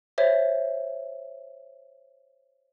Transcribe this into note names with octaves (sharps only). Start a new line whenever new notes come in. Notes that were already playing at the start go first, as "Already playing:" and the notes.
C5 C#5 E5